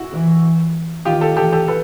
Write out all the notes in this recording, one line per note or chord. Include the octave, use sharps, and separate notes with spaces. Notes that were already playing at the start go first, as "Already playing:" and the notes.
Already playing: E4 F#4
E3
D#3 F4 G4
G4 A4
E3 G4 A4
G4 A4
A4 B4